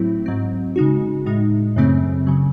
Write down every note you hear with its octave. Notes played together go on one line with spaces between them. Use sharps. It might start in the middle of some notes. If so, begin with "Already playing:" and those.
Already playing: A2 F#3 A3 C4 E4
G#2 F#3 C4
C#3 G#3 D#4 F#4
A2 G#3 D#4
F#2 C#3 F#3 A3 C4
C#3 F#3